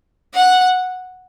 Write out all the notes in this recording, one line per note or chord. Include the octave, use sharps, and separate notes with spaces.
F#5